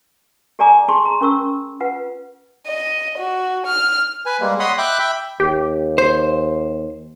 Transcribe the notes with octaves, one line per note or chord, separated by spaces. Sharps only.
G4 A4 D5 G#5 A#5 D6
G#4 A5 C6 C#6
A#5
C#4 A#4 C#6 E6
F4 B4 F#5
D#5
F#4
F6
B4 G#5
G3 G#3 A#3
C#5 D#5 F#5 B5 C6 D#6
E5 G5 B5 D6 F#6
E5 G5 B5
D#2 G4
C5